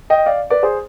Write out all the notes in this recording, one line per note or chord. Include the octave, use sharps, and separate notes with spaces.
D#5 G5
D5 F5
B4 D5
G#4 C5